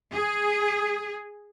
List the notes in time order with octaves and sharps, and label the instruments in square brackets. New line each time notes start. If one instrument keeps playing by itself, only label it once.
[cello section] G#4